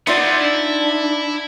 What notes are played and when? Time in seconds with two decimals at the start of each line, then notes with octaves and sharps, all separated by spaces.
0.07 E3 B3 D#4 F4 D5 E5 F#5 C6
0.40 D4 E4